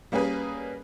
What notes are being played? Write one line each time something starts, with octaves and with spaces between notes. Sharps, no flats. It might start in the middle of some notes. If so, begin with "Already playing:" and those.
G3 A#3 C#4 G#4 B4